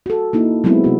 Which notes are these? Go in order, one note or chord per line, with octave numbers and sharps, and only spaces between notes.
F#4 A4
A#3 D#4 E4
F#3 G#3 B3 C4 E4
C3 F#4